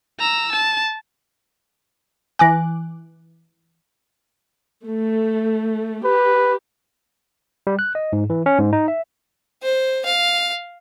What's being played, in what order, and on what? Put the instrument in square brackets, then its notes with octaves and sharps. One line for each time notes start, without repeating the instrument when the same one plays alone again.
[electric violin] A#5 E6
A5
[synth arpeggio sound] E3 D6 F#6 [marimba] G#5 A#6
[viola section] A3
[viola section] G4 [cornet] B4
[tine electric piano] G3
F#6
D#5
G#2
E3
C#4
G#2
D#4
E5
[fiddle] C5
F5